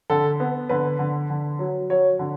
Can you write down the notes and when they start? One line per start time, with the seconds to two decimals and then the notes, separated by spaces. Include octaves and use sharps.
0.10 D3 A4
0.40 B3
0.69 D3 B4
0.99 D3
1.30 D3
1.59 F#3
1.90 F#3 C#5
2.19 D3